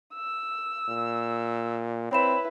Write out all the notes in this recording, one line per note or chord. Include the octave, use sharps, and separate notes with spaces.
E6
A#2
C4 E4 B4 C#5 B5 E7